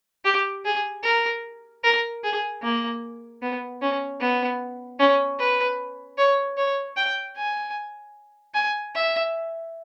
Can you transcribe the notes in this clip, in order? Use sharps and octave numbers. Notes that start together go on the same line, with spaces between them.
G4
G#4
A#4
A#4
G#4
A#3
B3
C#4
B3
C#4
B4
C#5
C#5
G5
G#5
G#5
E5